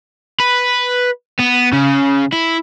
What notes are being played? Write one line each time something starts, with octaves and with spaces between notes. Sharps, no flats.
B4
B3
C#3
E4